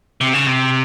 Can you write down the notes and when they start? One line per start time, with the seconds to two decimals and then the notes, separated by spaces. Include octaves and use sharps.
0.21 C3
0.34 C#3
0.46 C3